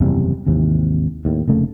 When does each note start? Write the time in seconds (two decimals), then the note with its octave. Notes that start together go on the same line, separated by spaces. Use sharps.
0.01 F#1 E2 C3 G3
0.46 G#1 D#2 C3 E3
1.25 D#2 A2
1.48 F1 C#3 A3 A#3